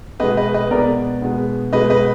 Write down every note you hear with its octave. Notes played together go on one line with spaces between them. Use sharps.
B2 G#3 B3 B4 D#5
B4 D#5
B4 D#5
B2 G#3 B3 A#4 D5
B2 G#3 B3
B2 G#3 B3 B4 D#5
B4 D#5